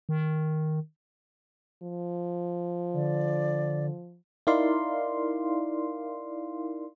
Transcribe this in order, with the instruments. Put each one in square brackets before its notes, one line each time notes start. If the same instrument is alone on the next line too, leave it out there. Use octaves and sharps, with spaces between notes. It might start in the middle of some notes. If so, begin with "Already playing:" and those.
[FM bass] D#3
[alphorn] F3
[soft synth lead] D3 [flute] D5
[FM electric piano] D#4 E4 A#4 D5 F5 C6